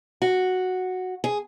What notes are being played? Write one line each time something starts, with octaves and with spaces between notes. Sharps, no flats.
F#4
G#4